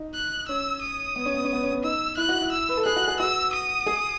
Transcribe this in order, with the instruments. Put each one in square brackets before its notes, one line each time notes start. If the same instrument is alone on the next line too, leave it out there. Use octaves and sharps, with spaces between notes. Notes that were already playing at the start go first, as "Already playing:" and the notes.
Already playing: [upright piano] D#4
[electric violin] F#6
[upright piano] C#4 [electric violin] E6
[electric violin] D#6
[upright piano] B3
C#4
B3
C#4
B3
C#4
B3
[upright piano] D#4 [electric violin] E6
[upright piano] E4 [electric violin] F#6
[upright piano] F#4
E4
[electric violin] E6
[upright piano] B4
A4
[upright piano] G#4 [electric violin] F#6
[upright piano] F#4
G#4
[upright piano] F#4 [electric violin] E6
[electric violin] D#6
[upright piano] G#4